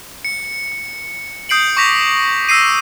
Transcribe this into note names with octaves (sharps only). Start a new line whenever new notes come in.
C#7
D#6 G6 C7 D7 F#7
C#6 D6 A#6 B6 F7
E6 A#6 C7 D#7